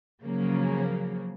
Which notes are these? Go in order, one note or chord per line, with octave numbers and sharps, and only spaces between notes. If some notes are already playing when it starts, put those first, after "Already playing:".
C#3 F3 F#3 A#3